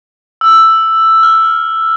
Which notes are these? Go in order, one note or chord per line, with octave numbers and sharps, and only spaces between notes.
E6
F6